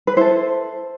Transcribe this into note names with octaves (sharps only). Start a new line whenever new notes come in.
B4
E4 A4 C5